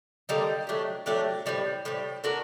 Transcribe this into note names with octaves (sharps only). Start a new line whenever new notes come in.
D3 G3 A#3 D#4
F#3 A3 D4 G4
F#3 A3 D4 G4
A2 G3 C4
A2 G3 C4
A3 D4 F#4 A#4